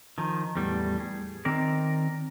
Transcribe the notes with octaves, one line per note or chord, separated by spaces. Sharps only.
D#3 F3
E2 A2 G3
G#4
D#3 C4 A#4 D5